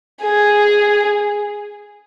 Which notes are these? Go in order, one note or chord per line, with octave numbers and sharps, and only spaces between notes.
G#4